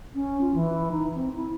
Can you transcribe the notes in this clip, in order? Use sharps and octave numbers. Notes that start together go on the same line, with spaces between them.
C#4
F4
E3
D#4
C4
E4